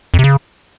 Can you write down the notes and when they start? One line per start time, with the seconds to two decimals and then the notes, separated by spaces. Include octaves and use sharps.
0.14 F2
0.19 C3
0.24 C#3